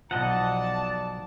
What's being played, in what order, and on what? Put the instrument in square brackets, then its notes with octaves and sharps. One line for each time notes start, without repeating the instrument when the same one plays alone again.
[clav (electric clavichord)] B1 F3 [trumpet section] D5 A5 [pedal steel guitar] D#5 F#5